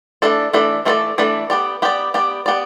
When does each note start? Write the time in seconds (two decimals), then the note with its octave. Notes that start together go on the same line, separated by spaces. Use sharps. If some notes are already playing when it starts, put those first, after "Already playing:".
0.22 E3 A3 D4 A4 D5
0.53 E3 A3 D4 A4 D5
0.85 E3 A3 D4 A4 D5
1.18 E3 A3 D4 A4 D5
1.50 B3 G4 D5
1.82 B3 G4 D5
2.14 B3 G4 D5
2.46 B3 G4 D5